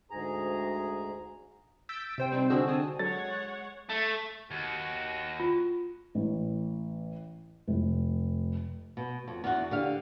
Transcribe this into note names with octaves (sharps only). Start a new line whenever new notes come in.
D2 G#2 G#4 A#5
E6 G6 A6 B6 D7
C3 C5 G5
G3 C4 D#4 C5
D3 D4 F#4 G#4 E6
C4 G#5 A5 D#6
F#3 G#3 A4 C#5 F#5 A6
A3
D#2 F#4
F4
A1
F1
B2
F2
E2 F#4
D3 G4 F5